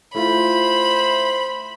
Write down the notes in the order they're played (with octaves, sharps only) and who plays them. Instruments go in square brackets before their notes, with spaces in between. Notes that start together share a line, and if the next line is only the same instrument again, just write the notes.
[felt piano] A3 E4 F4 [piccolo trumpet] C5 [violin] B5